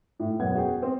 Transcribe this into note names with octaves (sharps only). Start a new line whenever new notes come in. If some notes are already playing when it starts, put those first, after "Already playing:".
A2
E1 F#2 B3 F#5 G#6
F#4 G#4 G5
C4